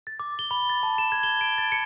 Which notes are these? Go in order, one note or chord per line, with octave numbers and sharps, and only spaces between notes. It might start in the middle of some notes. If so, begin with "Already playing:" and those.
A6
D6
G7
B5
A6
A5
E7
G#6
G7
D7
A6
C#7